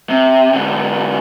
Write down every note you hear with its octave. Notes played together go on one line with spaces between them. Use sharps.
C3
G#2 D3